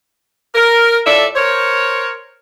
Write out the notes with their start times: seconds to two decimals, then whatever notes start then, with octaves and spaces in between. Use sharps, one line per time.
0.54 A#4
1.05 A2 F4 A4 D5 E5
1.35 A#4 C5 C#5